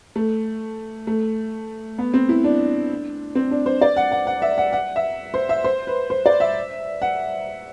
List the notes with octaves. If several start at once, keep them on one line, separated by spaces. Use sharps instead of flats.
A3
A3
B3
C4
E4
D4
C4
D4
C5
D5
F#5
F#5
F#5
E5
F#5
F#5
E5
C5
E5
C5
B4
C5
D5
E5
F#5